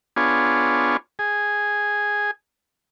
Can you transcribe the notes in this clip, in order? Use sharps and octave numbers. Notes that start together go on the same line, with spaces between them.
B3 D4 F4 G#4 C#5
G#4